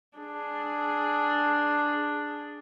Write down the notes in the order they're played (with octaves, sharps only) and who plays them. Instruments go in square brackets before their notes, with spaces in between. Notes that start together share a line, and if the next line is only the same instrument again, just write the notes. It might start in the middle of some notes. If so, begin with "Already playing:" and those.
[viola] D4 G#4